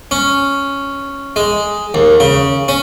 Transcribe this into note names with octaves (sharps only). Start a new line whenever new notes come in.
C#4
G#3
D#2
C#3
C#4